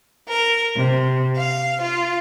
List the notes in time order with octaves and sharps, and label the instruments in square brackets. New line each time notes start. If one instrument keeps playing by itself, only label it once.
[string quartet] A#4
C3
F5
F4